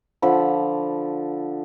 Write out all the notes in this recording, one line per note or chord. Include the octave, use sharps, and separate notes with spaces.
D3 F3 B5